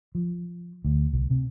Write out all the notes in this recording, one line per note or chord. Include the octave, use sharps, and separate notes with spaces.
F3
D2
C2
C3